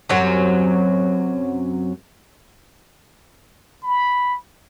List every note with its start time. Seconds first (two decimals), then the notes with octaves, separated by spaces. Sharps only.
0.09 F#2 C3 F#3
3.83 B5